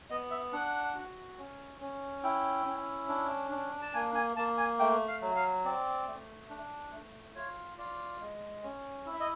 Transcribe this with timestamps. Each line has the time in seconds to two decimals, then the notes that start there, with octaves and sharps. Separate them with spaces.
0.10 B3 D#5
0.31 E5
0.53 D4 F#5
0.95 F#4
1.37 C#4
1.81 C#4
2.23 E4 G5
2.66 C#4
3.09 D4
3.51 D4
3.82 A5
3.94 A#3 G#5
4.15 G#5
4.37 A#3 A5
4.58 G#5
4.79 A3 G5
5.08 F5
5.21 F#3
5.36 F5
5.65 C4 D5
6.07 A3
6.50 D4
6.92 A3
7.35 F4 C#5
7.78 F4 D5
8.21 G#3
8.63 C#4
9.06 E4
9.13 E5
9.20 D#5